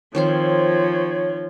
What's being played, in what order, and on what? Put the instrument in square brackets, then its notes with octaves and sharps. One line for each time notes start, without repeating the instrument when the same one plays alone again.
[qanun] D#3 C4 C5 [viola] F3 [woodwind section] C#5